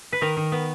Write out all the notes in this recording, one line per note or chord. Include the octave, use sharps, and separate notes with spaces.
B4
D#3 A#4
D#3
B3